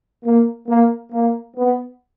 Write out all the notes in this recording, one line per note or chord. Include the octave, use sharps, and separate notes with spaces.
A#3
A#3
A#3
B3